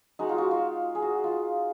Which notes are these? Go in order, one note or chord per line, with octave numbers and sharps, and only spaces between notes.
G#3 D#4 F#4
F4
F#4
F4
G#4
F#4
F4